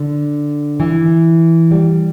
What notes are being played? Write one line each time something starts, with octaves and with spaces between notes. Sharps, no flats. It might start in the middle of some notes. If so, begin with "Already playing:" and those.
Already playing: D3
E3
G3